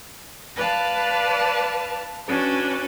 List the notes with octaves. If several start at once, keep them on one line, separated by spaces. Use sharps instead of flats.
B4 D5 F5 A5
C#4 D4 F#4 B4